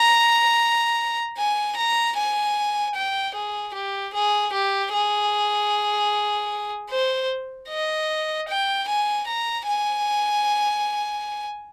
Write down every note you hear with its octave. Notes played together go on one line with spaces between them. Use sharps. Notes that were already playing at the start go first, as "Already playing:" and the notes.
Already playing: A#5
G#5
A#5
G#5
G5
G#4
G4
G#4
G4
G#4
C5
D#5
G5
G#5
A#5
G#5